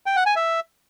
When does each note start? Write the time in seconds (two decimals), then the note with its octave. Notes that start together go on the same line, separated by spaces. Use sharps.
0.06 G5
0.16 F#5
0.26 G#5
0.36 E5